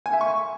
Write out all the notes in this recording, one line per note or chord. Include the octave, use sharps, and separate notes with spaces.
G#5
E5
C#6